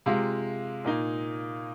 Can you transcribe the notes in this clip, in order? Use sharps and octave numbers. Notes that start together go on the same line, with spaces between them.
C3 G#3 F4
A#2 A#3 D#4